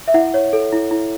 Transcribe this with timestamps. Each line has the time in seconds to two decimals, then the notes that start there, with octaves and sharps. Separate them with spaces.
0.08 E5
0.14 E4 F#5
0.34 C#5
0.53 A4
0.72 E4
0.91 E4